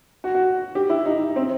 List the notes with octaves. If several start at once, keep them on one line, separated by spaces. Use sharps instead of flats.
F#4
F#4
G4
E4
D#4
C4